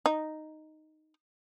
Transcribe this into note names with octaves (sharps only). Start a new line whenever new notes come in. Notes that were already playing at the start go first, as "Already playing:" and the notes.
D#4